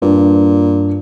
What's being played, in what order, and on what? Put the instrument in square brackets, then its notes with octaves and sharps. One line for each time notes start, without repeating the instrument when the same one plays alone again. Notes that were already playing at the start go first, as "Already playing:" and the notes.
[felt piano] G2 [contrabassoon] A#2